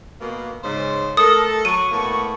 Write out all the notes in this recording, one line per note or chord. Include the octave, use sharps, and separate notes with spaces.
B2 A#3
G#2 C#3 C5
A3 A4 A#4 D#6
F#3 C#6 D#7
A2 A#3 B3